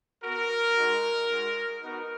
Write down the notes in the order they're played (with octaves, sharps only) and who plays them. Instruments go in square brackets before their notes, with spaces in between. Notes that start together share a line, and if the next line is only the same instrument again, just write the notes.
[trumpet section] B3 F#4 A#4
G#3 D#4 F#4
G#3 D#4 F#4
B3 D#4 F#4 A#4